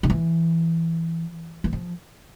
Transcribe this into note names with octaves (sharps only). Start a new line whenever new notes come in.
D3
E3
E3
F3